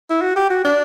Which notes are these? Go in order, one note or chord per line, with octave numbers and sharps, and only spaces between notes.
E4
F#4
G4
F#4
D4